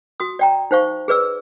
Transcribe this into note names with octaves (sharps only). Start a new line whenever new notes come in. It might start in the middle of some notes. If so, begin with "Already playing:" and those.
F#4 D#6
D5 G5 A#5
D#4 C5 F5 C#6
G#4 B4 D5 E6